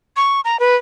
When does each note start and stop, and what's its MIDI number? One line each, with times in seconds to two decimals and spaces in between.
0.17 0.41 85
0.45 0.59 82
0.60 0.76 71